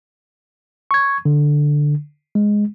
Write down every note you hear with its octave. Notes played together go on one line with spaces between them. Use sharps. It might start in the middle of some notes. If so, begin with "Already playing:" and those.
C#6 G#6
D3
G#3